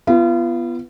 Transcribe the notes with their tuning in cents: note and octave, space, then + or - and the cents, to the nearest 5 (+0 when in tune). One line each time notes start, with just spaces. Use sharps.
B3 +0 F4 -35